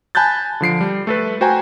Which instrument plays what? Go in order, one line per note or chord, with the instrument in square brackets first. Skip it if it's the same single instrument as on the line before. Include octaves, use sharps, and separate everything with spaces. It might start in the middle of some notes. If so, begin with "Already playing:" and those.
[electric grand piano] G#5 A5 B5 F#6 G6 A6
D3 F3 C7 D7
G3
A3 A4 B4
F#4 C5 G5 G#5 A#5